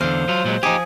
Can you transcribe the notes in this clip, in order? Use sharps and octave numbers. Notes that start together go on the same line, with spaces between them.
E2 D3 C5 F5
F#3 F4
A#2 F#3 G#3
F3 D#4 G4 G#4